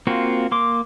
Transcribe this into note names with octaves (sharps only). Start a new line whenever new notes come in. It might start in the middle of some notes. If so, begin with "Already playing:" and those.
A#3 C4 F4 F#4
A#3 C6 D6